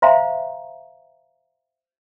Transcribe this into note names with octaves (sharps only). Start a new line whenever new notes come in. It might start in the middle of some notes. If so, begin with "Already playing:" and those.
C5 E5 F5 G#5 A#5 C6